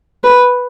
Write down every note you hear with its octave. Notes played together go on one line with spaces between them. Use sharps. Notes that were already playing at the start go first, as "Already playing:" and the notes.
B4